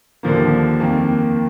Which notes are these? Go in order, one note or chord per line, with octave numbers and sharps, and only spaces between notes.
D#2 D3 F3 A#3
F2 D#3 A#3